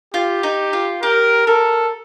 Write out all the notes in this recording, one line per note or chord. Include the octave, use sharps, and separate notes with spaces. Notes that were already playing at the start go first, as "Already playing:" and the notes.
F4 G4
D#4
F4
G4 A#4
A4 A#4